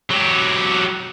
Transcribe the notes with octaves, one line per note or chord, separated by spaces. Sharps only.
F#3 G4